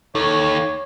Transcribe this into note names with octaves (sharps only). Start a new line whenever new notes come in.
D#2 D#4 A4 C#5